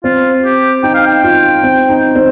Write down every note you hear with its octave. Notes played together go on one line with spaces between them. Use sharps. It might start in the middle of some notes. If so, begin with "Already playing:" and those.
C4 F4
G4
D#4 G5
F5
G5
F4
C4
D#4
C4